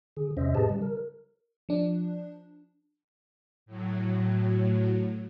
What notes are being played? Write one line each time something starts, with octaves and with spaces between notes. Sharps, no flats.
D3 G#4
E2 C3 C#4 C5 D#5 E5
A2 G4 G#4 B4 D#5 A5
C#3 G3
A#4
F3 D4
A2 F#3